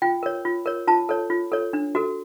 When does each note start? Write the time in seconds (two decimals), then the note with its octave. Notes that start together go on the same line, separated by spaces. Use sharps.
0.02 F4 G5
0.23 A#4 C#5
0.45 F4
0.66 A#4 C#5
0.87 F4 A5
1.09 A4 C#5
1.30 F4
1.52 A4 C#5
1.73 D4
1.95 F#4 A4